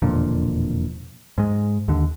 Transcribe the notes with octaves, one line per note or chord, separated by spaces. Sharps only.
E1 F2 A#2 D3
G#2 G#3
D#2 D3